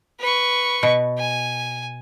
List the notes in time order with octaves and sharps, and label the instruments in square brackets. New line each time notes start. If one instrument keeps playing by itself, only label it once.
[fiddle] B4 C#6
[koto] B2
[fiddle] G#5